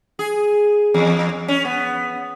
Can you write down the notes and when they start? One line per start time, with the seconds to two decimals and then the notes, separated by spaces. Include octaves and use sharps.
0.19 G#4
0.94 E2
1.48 C#4
1.65 B3